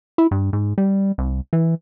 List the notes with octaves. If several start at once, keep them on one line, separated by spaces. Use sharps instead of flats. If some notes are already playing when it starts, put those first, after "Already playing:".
E4
G2
G#2
G3
C2
E3